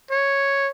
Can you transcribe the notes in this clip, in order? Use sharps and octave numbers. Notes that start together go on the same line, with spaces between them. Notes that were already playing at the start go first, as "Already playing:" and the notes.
C#5